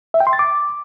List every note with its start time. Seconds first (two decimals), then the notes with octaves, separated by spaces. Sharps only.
0.14 E5
0.20 G5
0.27 C6
0.33 A6
0.39 D6